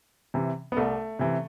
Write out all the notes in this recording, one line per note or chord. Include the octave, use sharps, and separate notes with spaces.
C3 E3
B3
C2 A3
C3 E3